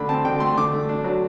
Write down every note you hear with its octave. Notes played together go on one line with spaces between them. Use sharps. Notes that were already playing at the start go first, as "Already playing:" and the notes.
Already playing: D3 A3 B5
C4 A5
D3 G5
A3 C6
D3 D6
A3
D4
F#3